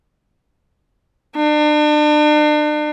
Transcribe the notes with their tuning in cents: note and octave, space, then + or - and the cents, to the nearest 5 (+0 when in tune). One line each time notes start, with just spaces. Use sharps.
D4 +40